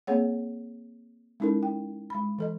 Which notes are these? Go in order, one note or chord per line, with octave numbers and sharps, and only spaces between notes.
A#3 C4 G#4 C#5 F#5
G#3 C#4 D#4 E4 A4 A#4
G5
G#3 B5
E3 A4 D#5